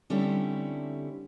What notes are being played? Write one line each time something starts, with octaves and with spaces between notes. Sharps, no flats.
D3 G3 A3 C4 C#4 E4